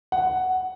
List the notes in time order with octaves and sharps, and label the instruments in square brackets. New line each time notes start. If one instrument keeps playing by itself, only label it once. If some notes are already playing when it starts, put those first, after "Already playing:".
[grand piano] F#5